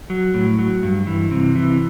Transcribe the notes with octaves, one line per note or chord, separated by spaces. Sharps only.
F#3
A2
F#3
G2
E3
C3
E3